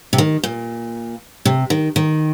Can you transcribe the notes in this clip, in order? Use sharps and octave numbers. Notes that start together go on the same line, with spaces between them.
C3
D#3
A#2
C3
D#3
D#3